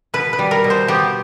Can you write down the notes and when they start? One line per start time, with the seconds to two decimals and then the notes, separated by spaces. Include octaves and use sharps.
0.14 B2 B4
0.33 B4
0.39 G3
0.51 A#4
0.64 B2
0.70 C5
0.88 B3 G4